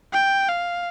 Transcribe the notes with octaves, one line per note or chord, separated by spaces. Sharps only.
G5
F5